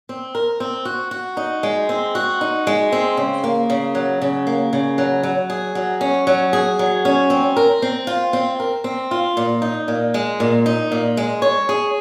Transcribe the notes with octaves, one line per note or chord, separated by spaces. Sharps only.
C4
A#4
C4
F#4
F#4
D#4
G#3
C4
F#4
D#4
G#3
C4
C#3
A#3
C#3
F#3
C#3
A#3
C#3
F#3
F#3
G#4
F#3
C#4
F#3
G#4
F#3
C#4
C4
A#4
C4
F4
C4
A#4
C4
F4
A#2
D#4
A#2
G#3
A#2
D#4
A#2
G#3
C#5
G#4